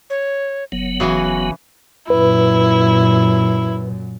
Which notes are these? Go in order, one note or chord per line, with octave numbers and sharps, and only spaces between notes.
C#5
F#1 F#3 B3
C#3 E3 F#4 G#5
F#2 A#2 E4 B4